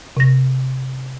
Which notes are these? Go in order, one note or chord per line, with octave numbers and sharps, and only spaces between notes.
C3 A#6